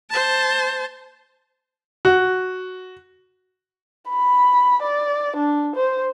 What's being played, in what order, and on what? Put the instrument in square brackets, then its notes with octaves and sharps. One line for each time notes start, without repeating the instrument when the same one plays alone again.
[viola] C5 A5
[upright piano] F#4
[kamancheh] B5
D5
D4
C5